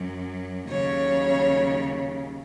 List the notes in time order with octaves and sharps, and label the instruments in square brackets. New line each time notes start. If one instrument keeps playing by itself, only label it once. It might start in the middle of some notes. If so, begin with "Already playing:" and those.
Already playing: [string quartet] F#2 F#3
D#2 C#3 F#3 C#5